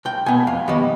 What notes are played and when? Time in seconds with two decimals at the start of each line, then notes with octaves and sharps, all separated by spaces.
0.05 C2 G5
0.26 B2 B3 G#5
0.47 F2 F5
0.68 D#3 G3 B3 D#5